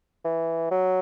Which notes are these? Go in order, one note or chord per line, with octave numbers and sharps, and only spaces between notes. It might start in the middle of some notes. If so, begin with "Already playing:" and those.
E3
F#3